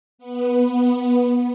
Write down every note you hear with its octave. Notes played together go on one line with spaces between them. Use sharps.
B3